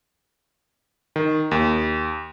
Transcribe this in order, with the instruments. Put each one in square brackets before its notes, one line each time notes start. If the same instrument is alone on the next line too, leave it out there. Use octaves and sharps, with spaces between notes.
[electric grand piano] D#3
D#2